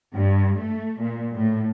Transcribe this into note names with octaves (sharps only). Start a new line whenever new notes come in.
G2
A3
A#2
A2